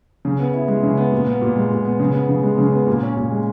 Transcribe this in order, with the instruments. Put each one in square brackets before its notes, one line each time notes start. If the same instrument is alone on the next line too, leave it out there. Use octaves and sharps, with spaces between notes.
[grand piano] C#3
B3
E4
G#3
C#3
B3
A#2
B3
A#2
G#3
A#2
B3
C#3
B3
C#3
G#3
C#3
B3
A#2
C#4
A#2
G#3